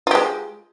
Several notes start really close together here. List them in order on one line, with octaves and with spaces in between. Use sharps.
F4 G4 G#3